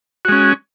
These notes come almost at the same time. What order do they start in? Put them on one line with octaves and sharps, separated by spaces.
F#4 G#3 C#4